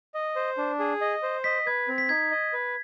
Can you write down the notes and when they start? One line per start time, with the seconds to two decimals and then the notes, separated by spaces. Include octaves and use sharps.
0.14 D#5
0.36 C5
0.58 D4
0.79 G#4
1.01 D#5
1.23 C5
1.44 D#5 B6
1.66 B4 G#6
1.88 C4
1.98 B6
2.09 D#4 G#6
2.31 D#5
2.53 B4